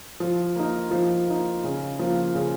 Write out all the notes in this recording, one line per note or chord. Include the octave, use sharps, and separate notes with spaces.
F3
A#3 D#4
F3
A#3 D#4
C#3
F3 A#3
C#3